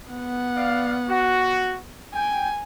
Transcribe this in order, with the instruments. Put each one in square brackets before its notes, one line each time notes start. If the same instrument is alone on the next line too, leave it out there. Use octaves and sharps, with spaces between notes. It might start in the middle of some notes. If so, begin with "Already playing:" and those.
[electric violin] B3 F#5
[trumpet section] D5 F5
F#4
[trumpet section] G5 [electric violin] G#5